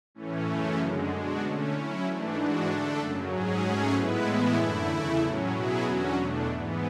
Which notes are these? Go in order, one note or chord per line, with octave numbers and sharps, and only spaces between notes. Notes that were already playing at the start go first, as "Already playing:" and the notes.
A2 E3 A3 C#4
F#2 C#3 E3 A3 C#4
F#2 D3 G#3
B2 G#3 D4 F#4
D3 A3 C#4
F#3 C#4 E4
G#2 E3 A3 D4
G#2 E3 G#3 D4 F#4
D3 A3 D4 A4
F#2 C#3 F#3
G#2 F#3 C#4 G#4
G#2 F#3 A3 C#4 G#4
A2 G#3 B3 E4 B4
A2 E3 G#3 B3 E4
F#2 D3 A3 E4
E2 C#3 E3 A3 E4
A2 F#3 C#4
B2 F#3 B3 E4 G#4
E2 D3 F#3 C#4 F#4
E2 B2 A3 D4
G#2 E3 B3